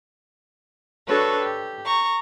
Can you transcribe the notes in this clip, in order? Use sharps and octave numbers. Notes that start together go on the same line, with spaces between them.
D4 F#4 A4 B4 C#5
G4
A#5 C#6